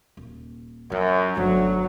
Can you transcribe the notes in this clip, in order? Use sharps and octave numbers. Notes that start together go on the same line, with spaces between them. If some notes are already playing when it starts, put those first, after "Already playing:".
D#1
F#2 E3 F4
G1 D2 G2 F#3